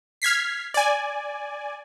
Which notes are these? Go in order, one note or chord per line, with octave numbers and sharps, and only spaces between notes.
F6 G#6 B6 C7
D5 G#5